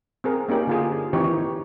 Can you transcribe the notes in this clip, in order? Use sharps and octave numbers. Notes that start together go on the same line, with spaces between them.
C4 G#4 A#4
A#3 C#4 D#4 G4
D3 F4 G#4
D#3 E3 C4 D#4 G4 C#5